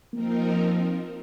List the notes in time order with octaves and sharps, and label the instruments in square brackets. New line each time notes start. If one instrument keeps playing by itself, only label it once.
[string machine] F3 C4 D#4 A#4 [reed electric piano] A#3